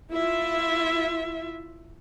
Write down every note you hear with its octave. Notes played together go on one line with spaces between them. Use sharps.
E4 F4 E5